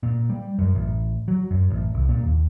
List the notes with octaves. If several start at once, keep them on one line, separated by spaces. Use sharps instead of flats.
A#2
G3
F#2
A1
F#3
F#2
A1
C2
A#2
D#2